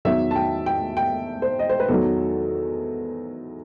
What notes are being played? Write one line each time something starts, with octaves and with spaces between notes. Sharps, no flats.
E2 D#3 F#3 E5
A5
G5
G5
G5
C5
D#5
C5
B4
E2 D#3 F#3 A4